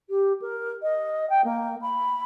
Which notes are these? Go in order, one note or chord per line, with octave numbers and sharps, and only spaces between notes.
G4
A#4
D#5
G5
A#3
B5